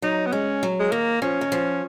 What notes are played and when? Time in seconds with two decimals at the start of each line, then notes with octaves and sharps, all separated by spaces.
0.02 F#3 D#4
0.26 B3
0.32 G#3 C#4
0.63 F#3
0.79 G#3
0.92 D#3 A#3
1.22 F3 C#4
1.41 D#3
1.52 F3